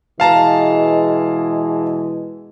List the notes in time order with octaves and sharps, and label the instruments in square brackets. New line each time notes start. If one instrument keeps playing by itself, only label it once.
[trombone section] B2 E3 G#3 [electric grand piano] F5 A5 A#5